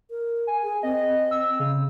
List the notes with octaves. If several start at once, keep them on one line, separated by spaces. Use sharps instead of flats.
A#4
G#5
G#4
C4 D#5
E6
C#3